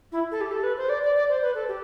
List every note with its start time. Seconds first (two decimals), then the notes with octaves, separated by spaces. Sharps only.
0.12 E4
0.32 A4
0.41 G4
0.51 A4
0.63 B4
0.77 C5
0.89 D5
1.03 D5
1.15 D5
1.29 C5
1.42 B4
1.55 A4
1.68 G4